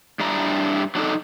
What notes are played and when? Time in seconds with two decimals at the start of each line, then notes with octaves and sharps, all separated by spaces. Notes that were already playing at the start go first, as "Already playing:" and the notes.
0.20 G2 D4 E4 A#5
0.95 F#3 D4 D#4 A4